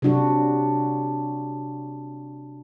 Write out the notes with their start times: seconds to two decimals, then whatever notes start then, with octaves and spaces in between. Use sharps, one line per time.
0.02 C3 F#3 D4 F#4